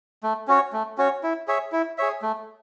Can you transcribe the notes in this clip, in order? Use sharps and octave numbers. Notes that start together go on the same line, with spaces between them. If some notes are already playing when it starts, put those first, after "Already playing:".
A3
C#4 F#4 C#5
A3
C#4 F#4 C#5
E4
G#4 C#5 E5
E4
G#4 C#5 E5
A3